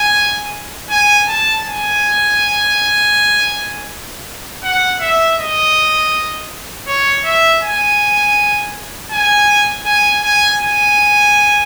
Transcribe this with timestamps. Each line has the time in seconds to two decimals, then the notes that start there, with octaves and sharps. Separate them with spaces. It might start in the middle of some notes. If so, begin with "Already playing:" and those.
Already playing: G#5
0.91 G#5
1.28 A5
1.65 G#5
4.64 F#5
5.01 E5
5.38 D#5
6.88 C#5
7.25 E5
7.62 G#5
9.12 G#5
9.86 G#5
10.23 G#5
10.61 G#5